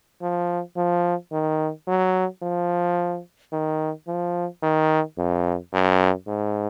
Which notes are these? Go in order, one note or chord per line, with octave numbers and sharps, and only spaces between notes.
F3
F3
D#3
F#3
F3
D#3
F3
D#3
F2
F#2
G#2